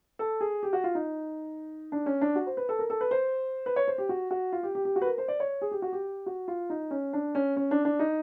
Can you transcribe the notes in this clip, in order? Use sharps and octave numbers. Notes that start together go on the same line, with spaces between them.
A4
G#4
G4
F#4
F4
D#4
D4
C#4
D4
F#4
C5
B4
A4
A#4
A4
B4
C5
B4
C#5
C5
G4
F#4
F#4
F4
G4
G4
G4
F#4
B4
A#4
C5
D5
C#5
G#4
G4
F#4
G4
F#4
F4
D#4
C#4
D4
C#4
C#4
D4
D4
D#4